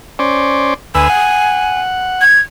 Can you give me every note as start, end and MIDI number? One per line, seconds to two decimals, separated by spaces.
0.19 0.74 61
0.19 0.74 72
0.19 0.74 74
0.95 1.08 38
0.95 1.08 71
0.95 1.80 80
0.95 1.08 88
1.10 2.24 78
2.21 2.39 92